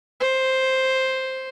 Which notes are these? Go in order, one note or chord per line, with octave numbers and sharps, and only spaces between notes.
C5